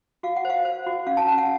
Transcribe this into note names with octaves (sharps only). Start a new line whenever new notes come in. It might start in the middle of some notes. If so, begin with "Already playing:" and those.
F#4 F5
F#5
C5 F5
C5
F#4
C#4 F5
A5
C#4 A5
F#5